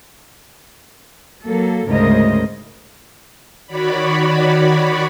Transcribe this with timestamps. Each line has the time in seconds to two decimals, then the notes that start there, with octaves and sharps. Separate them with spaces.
1.44 F#3 A#3 A4
1.88 D2 G#2 C#3 A#4 C5 D#5
3.67 D#3 F#4 C#5 D5 B5